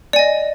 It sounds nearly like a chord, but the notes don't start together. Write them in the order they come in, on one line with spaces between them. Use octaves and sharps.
D5 G#5 D#5